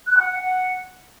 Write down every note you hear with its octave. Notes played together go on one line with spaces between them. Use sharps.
F#6
F#5
F#5
F#5